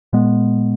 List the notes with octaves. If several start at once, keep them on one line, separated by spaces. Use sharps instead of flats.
A#2 G#3 B3